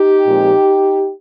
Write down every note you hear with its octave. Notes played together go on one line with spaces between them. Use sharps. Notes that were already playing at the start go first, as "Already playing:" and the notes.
Already playing: D#4 G4
A#2 F3 G#3 C4